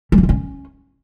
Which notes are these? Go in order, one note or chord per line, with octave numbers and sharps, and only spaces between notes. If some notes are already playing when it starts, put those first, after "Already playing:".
G3
A#3
G#3
C#4